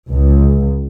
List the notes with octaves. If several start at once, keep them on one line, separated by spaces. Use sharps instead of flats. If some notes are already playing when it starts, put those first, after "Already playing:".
C#2